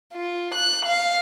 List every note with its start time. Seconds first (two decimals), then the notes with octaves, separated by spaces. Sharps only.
0.13 F4
0.55 F#6
0.86 F5